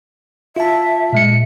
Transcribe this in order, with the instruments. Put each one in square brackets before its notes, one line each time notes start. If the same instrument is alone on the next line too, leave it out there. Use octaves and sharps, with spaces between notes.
[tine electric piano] F4 A5 [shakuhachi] E5
[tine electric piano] A#2 G#3 C#7